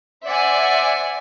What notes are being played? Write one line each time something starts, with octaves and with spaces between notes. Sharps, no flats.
C5 D5 E5 F#5 G#5